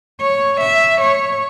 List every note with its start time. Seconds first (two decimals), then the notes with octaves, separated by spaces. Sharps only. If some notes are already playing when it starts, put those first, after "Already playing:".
0.21 C#5
0.61 E5
1.01 C#5